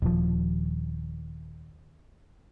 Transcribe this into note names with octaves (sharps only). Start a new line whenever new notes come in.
D#1 F3